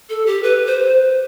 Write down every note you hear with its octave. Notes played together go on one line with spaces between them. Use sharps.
A4
G4
B4
C5